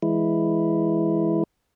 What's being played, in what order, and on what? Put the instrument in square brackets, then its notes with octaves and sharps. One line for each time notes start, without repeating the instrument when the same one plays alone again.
[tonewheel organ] E3 G#3 E4